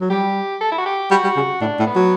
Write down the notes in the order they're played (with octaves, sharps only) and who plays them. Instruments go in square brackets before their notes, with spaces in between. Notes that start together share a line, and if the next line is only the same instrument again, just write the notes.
[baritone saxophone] F#3
[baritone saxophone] G3 [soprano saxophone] G4
[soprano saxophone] A4
E4
F#4
G4
[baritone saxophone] G3 [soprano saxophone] F#4
[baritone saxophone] G3
C#3
[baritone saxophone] A2 [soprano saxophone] D4
[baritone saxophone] A2
[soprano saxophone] B3
[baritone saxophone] F#3